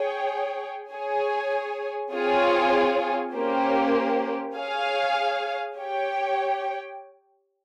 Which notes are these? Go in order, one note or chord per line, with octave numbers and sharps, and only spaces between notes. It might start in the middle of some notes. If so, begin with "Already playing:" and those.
Already playing: G#4 C#5 G5
G#4 C#5 G#5
C4 F4 G#4 C#5 G#5
A#3 C#4 G4 C5
G#4 C#5 F5 G#5
G4 C#5 G5